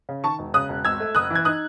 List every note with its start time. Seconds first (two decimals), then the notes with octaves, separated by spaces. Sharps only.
0.09 C#3
0.24 D#3 A5 C#6
0.39 E1
0.54 C#3 D#6 F#6
0.69 E1
0.85 G#1 E6 G#6
1.00 A3
1.15 F#1 D#6 F#6
1.30 E3
1.35 G#6
1.45 D#4 D#6 F#6